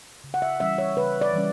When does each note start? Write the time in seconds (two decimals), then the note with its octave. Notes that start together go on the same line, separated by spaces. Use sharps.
0.24 C#3
0.34 F#5
0.42 E5
0.60 E3 G3 C#4 E5
0.78 C#5
0.97 C#3 B4
1.21 D5
1.34 E3 G3 C#4